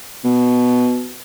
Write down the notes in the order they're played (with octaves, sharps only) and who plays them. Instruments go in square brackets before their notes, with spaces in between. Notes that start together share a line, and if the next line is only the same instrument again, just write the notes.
[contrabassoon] B2